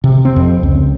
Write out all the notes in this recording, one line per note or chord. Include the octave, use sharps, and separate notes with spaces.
C3
C4
F2
C#2